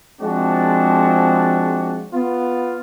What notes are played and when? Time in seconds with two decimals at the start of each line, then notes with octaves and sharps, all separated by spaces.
0.20 F3 G#3 C4 D4 F#4
2.13 B3 F4